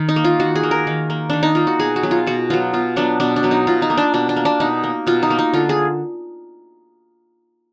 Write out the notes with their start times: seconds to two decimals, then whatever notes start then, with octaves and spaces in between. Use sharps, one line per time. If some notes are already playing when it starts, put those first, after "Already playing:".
Already playing: D#3
0.09 D#4
0.16 A#3
0.24 F4
0.40 D#3 F#4
0.55 G#4
0.63 A#3
0.71 A#4
0.87 D#3
1.10 A#3
1.30 D#3 D4
1.43 D#4
1.55 A#3 F4
1.67 F#4
1.79 B2 G#4
1.96 F#4
2.03 F#3 B3
2.11 F4
2.27 B2 F#4
2.50 F#3 B3 F4
2.73 B2 F4
2.96 F#3 B3 D4
3.20 B2 D4
3.36 D4
3.43 F#3 B3
3.51 D#4
3.67 B2 F4
3.82 D#4
3.90 A#3
3.97 D4
4.14 B2 D4
4.29 D4
4.36 A#3
4.45 D4
4.60 B2 D#4
4.83 A#3
5.07 B2 F4
5.23 D#4
5.30 A#3
5.39 D#4
5.54 D3 F4
5.69 G#4